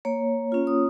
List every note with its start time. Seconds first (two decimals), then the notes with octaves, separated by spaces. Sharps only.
0.05 A#3 C#5
0.52 C#4 F4
0.67 D#6